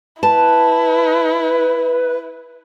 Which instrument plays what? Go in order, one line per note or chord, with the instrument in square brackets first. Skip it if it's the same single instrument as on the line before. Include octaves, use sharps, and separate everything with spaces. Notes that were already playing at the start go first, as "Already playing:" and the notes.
[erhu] E4 [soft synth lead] B4 [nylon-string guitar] A5